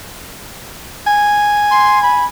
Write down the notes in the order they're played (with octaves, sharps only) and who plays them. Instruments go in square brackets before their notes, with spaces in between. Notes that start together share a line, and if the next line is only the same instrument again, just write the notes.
[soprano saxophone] G#5
[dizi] C6
B5